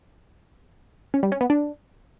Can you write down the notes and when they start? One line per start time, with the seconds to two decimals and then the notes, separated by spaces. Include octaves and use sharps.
1.14 C#4
1.23 G3
1.32 C#4
1.41 B3
1.50 D4